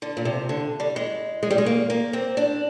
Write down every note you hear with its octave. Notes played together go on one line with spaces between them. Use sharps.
D3
A#2
C3
D3
G3
G#3
G#3
G3
G#3
A#3
A#3
C4
D4